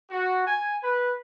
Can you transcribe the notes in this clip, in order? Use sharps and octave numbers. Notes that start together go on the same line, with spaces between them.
F#4
G#5
B4